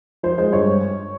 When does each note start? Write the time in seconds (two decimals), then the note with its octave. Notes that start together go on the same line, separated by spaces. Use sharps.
0.23 F3 C5
0.38 G#3 C5
0.53 G2 C#5